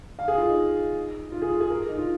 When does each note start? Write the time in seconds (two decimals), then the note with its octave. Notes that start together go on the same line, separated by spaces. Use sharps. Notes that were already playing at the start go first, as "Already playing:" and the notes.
0.19 F5
0.28 G#4
0.38 F4
0.47 D#4
1.32 F4
1.42 G#4
1.51 F4
1.61 G#4
1.70 A#4
1.89 D#4
1.99 F4